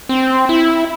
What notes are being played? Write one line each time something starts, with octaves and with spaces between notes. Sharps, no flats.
C4
E4